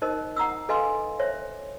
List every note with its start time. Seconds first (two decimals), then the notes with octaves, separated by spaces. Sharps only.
0.02 D#4 A#4 C5 D#5
0.36 F#5 A#5 D#6 E6
0.69 A4 B4 D#5 F5 G#5 C6
1.19 C5 C#5 E5